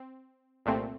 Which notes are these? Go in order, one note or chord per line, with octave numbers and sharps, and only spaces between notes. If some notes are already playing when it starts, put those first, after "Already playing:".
Already playing: C4
C2 A#2 A3 C4